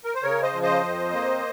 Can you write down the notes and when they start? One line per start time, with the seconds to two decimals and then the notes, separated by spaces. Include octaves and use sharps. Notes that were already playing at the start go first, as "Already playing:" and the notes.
0.04 A#4
0.15 C5
0.23 C#3 A#4 C#5
0.43 C5 D#5
0.53 F3
0.62 C5 D#5
0.83 F2
1.13 A#3